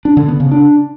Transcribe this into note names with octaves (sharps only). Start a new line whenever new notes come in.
D4
D3
B3
C#3
D4